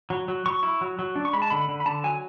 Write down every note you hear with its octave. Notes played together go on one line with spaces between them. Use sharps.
F#3
F#3
F#3 C#6
E4
F#3
F#3
D4
C#6
G#3 B5
A5
D3 B5
D3
B5
D3 A5
F#3 G#5